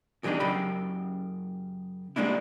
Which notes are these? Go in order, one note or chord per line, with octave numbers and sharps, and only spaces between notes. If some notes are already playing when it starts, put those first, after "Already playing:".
E2 E3 G3 A#3 D4 D#4
F#2 C#3 G4 B5
G3 G#3 A#3 D4 E4